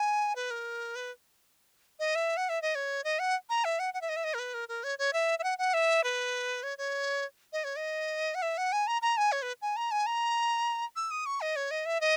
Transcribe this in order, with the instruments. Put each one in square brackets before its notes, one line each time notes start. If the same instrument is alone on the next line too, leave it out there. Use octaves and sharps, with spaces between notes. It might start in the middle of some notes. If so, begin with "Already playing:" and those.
Already playing: [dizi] G#5
B4
A#4
B4
D#5
E5
F#5
E5
D#5
C#5
D#5
F#5
A#5
E5
F#5
F#5
E5
D#5
E5
D#5
A#4
B4
A#4
A#4
C#5
C#5
E5
E5
F#5
F#5
E5
B4
C#5
C#5
D#5
C#5
D#5
F#5
E5
F#5
G#5
A#5
A#5
G#5
C#5
B4
G#5
A#5
G#5
A#5
E6
D#6
C#6
D#5
C#5
D#5
E5
D#5